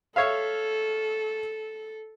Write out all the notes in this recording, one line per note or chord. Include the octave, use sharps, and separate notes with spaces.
A4 C#5 E5 F5